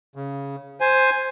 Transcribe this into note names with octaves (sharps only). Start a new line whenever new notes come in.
C#3
C5 G#5